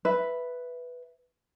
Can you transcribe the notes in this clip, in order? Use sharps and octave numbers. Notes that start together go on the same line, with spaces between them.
B4 E5